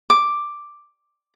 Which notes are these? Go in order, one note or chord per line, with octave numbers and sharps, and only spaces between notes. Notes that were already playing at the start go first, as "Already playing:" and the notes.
D6